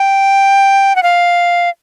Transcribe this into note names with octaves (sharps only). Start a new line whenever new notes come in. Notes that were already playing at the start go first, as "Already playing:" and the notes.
Already playing: G5
F#5
F5